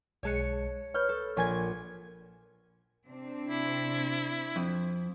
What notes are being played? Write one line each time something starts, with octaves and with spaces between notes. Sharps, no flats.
B1 G#3 C#5 A5 F#6 C#7
B4 C#5 F6 G6
A4
A#1 C#5 G#5 G#6
C3 C4 D4
E4
F2